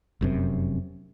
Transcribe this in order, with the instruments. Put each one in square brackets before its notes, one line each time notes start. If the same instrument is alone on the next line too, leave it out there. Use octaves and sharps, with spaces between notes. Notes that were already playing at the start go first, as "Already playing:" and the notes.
[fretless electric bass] F1 F#2 C3